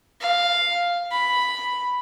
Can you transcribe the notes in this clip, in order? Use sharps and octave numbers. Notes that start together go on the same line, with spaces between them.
F5
B5